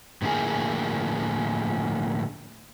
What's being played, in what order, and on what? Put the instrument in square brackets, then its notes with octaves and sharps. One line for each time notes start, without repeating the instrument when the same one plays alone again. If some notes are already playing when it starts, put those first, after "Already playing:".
[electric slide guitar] A2 D3 F3 A#3 G#4